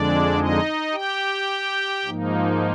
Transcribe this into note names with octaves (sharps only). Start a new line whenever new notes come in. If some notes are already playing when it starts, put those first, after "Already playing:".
Already playing: F2 D3 G#3 D4 D5
D#4 D#5
G4 G5
G#2 F3 A#3 D#4